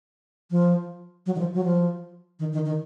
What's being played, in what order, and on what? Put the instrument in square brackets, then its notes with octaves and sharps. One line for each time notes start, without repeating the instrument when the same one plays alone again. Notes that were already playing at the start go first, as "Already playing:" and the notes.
[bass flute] F3
F#3
D#3
F3
F#3
F3
D#3
D#3
D#3